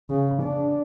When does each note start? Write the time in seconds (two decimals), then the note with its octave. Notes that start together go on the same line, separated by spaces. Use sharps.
0.10 C#3
0.43 D4